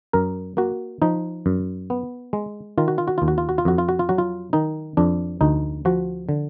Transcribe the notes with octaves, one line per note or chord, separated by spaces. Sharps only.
F#2 A#4
A#3 F#4
F3 D#4
F#2
B3
G#3
D#3 F4
F#4
F4
F#4
D#2 F4
F#4
F4
F#4
F4
F2 F#4
F4
F#4
F4
F#3 F#4
F4
D#3 D#4
F2 D4
D2 D#4
F3 F#4
D3